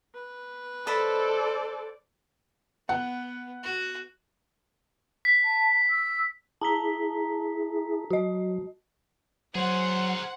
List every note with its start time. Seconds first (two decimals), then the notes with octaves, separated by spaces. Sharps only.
0.14 B4
0.87 A4 C5 D5 D#5 A5 B5
2.89 B3 F#5
3.63 F#4
5.25 B6
5.44 A5
5.90 E6
6.61 E4 G#4 A5 A#5 B6
8.11 F#3 F#4 D#5
9.55 F#3 G#4 A#4 C5 F#5